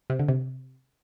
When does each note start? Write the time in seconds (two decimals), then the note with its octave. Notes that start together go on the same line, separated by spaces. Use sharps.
0.10 C3
0.19 D3
0.29 C3